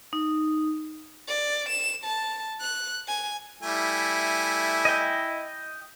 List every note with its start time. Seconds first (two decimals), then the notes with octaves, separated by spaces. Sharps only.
0.13 D#4
1.28 D5
1.69 E7
2.04 A5
2.61 F#6
3.08 G#5
3.62 G3 A3 E4 G#5
4.85 D#5 G5